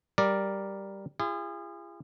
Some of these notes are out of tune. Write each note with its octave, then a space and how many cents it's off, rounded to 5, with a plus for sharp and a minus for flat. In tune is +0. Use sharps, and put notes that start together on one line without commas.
G3 +0 A#4 +0 D5 +0
F4 -45 G#4 -30